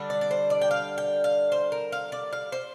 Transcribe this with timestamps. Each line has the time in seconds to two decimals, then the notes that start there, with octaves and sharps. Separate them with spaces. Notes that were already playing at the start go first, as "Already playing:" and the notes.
Already playing: D3 G3 D4
0.10 D5
0.21 D5
0.31 C5
0.50 D5
0.61 G5
0.71 F5
0.98 G5
1.24 F5
1.52 C5
1.72 A#4
1.92 F5
2.12 D5
2.33 F5
2.52 C5